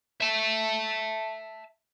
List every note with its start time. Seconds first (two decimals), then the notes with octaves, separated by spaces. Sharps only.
0.21 E5 A5